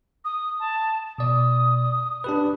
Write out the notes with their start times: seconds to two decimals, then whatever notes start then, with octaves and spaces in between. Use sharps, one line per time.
0.25 D#6
0.60 A5
1.18 B2 D5 D#6
2.24 D4 G4 B4